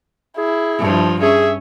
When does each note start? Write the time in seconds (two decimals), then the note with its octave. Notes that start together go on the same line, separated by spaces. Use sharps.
0.38 E4 G#4
0.79 G2 F3
1.22 C#4 G#4 E5